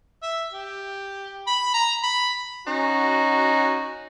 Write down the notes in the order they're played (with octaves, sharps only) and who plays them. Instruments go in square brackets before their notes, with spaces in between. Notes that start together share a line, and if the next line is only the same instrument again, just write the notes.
[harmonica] E5
G4
B5
A#5
B5
[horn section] C#4 D#4 F#4